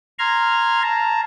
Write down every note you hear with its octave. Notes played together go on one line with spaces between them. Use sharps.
A#5 C6 F6 G#6
A5 A#5